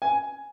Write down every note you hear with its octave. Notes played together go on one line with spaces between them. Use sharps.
G#5